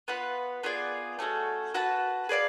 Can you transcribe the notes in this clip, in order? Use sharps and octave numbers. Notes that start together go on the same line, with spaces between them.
B3 F4 B4 F#5
B3 F4 G#4 D5
A3 C#4 F#4 A4
F#4 B4 F#5 A5
G#4 B4 D5 F5